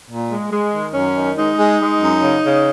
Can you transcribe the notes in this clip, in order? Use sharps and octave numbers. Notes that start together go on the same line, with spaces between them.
A#2
G#3
G#3
D#3
F#2 C#4
D#3
G#3 D#4
G#3
G#3
F#2
C#3
C#3